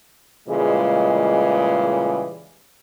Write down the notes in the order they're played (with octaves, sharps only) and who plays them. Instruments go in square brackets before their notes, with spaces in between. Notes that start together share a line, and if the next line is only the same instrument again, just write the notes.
[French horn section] A#2 C#3 E3 G3 G#3